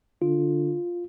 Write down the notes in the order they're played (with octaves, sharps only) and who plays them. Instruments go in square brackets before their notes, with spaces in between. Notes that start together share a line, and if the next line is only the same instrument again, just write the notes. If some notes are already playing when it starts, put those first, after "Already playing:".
[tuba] D3 [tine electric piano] F4